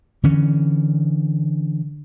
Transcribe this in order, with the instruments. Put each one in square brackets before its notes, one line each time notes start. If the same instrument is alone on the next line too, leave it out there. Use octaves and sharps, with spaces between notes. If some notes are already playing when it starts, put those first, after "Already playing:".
[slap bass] D3 E3 C#4